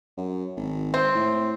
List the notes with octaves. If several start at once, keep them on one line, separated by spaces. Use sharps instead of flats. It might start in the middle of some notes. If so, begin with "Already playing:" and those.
F#2
G#1
C4
A2